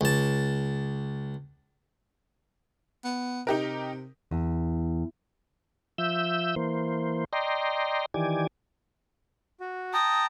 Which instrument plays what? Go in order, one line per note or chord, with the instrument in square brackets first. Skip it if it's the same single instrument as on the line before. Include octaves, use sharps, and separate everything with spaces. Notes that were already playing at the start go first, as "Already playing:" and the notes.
[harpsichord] C#2 A5
[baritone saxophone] B3
[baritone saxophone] C3 [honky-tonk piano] D#4 G4 A#4
[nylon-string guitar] E2
[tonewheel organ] F3 E5 E6 G6
E3 A#3 C5
D5 D#5 G5 A#5 C6
D#3 E3 G4 D5 G#5
[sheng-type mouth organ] F#4
[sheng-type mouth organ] G5 A5 A#5 [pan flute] D#6